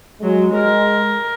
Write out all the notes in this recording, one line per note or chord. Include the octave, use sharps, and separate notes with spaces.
F#3 G#3
A#4